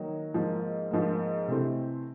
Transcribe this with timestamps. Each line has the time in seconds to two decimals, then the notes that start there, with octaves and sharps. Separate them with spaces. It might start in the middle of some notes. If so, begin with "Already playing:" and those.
Already playing: D#3 F#3 A#3
0.34 G#2 F3 A#3
0.91 G#2 F3 A#3
1.48 C3 E3 A3 C4